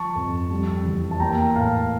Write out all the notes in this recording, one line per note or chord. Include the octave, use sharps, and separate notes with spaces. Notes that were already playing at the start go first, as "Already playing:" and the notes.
Already playing: F3 A5 C#6
F2
G3
E2
A5
A#3 G5 A#5
A2 F5 A5